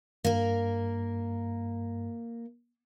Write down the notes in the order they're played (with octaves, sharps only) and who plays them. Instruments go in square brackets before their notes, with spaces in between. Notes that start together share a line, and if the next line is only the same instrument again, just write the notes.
[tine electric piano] G2 [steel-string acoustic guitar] A#3 A#4